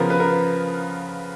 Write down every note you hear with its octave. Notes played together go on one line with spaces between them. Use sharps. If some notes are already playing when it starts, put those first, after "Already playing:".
Already playing: C#3 F3 B3 A#4
B4
A#4